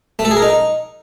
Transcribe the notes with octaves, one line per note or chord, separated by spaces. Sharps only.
A3
A4
G#4
A#4
D#4